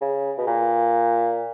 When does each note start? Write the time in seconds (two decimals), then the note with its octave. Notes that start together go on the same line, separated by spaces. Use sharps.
0.01 C#3
0.38 B2
0.47 A#2